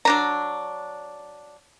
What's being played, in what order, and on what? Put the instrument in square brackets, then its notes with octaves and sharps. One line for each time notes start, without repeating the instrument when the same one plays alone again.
[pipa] F#3 D4 A#5